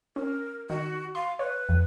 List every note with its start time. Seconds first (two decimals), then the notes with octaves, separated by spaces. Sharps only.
0.16 C#4 A#4
0.70 D#3 F#4
1.15 F5 C6
1.39 B4 C#5
1.69 F2